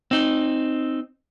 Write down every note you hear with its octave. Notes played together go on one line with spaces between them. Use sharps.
C4 D#4